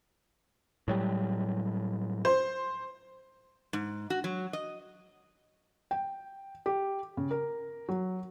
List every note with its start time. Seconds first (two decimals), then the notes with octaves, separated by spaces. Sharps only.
0.88 A2 F#3 G3
2.25 C5
3.73 G#2
4.10 F#4
4.24 F#3
4.53 D#5
5.91 G5
6.66 G4
7.17 C#3
7.31 A#4
7.89 F#3